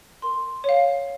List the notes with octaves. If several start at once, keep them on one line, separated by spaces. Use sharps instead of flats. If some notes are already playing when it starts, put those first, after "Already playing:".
A#4 C6
C#5 F5